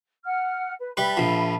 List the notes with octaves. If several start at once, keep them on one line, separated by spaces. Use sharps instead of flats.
F#5 F6
B4
G3 B4 E5 A5 B5
A#1 F3